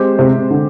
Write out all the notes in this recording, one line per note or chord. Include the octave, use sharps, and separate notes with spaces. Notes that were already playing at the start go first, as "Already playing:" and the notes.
Already playing: G#3 C4 G4 C5
C3
D3